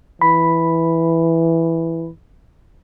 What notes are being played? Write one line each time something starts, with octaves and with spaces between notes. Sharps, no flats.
E3 B5